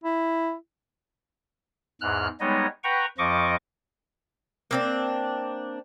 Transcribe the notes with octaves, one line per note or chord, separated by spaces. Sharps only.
E4
E2 G#2 F6 F#6
G3 G#3 B3 D#4 C#5 D#5
B4 F#5 G5 A#5 C#6
F2 F3 D#5 C#6 D6
A#3 C4 D4